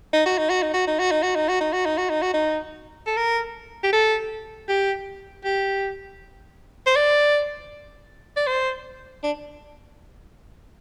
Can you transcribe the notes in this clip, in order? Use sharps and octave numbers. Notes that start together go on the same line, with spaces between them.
D#4
F#4
D#4
F#4
D#4
F#4
D#4
F#4
D#4
F#4
D#4
F#4
D#4
F#4
D#4
F#4
D#4
F#4
D#4
A4
A#4
G4
A4
G4
G4
C5
D5
D5
C5
D4